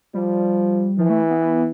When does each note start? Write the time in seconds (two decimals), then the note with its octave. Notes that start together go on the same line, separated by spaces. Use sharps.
0.14 F3 G3
0.98 E3 F3
1.10 A3
1.30 B3
1.41 B3